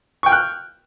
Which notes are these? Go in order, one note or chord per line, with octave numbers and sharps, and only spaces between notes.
G5 C#6 F6 F#6